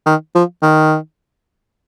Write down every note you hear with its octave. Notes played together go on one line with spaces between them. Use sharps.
D#3
F3
D#3